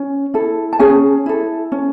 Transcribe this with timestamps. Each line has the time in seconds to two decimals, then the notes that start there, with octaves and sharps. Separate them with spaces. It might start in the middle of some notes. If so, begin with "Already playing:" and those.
Already playing: C#4
0.34 E4 A4
0.73 A5
0.79 C#4 G#4 G#5
1.26 E4 A4
1.72 C#4